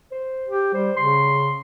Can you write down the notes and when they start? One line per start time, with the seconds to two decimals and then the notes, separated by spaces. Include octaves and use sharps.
0.12 C5
0.48 G4
0.74 G3 C5
0.97 C#3 C6